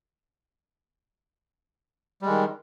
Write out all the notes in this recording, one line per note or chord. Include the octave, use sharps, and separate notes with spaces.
D#3 G3 G#3